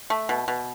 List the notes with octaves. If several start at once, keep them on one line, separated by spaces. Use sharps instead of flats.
A3
B2
B2